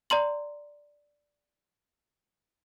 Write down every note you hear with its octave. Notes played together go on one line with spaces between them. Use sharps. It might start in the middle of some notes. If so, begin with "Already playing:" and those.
D5 A#5 C6 F#7